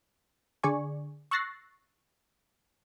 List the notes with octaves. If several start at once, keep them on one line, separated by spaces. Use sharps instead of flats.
D3 G#4 D5 G#5 C#6
C#6 E6 F#6 A6 A#6 C7